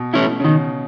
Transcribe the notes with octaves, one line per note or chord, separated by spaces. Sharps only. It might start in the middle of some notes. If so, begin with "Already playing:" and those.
Already playing: B2
A3 C#4 E4
C#3
B2 D#3